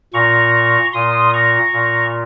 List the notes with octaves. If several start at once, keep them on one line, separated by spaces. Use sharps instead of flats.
A#2 A#5 C#6
A#2 C6 D#6
A#5 C#6
A#2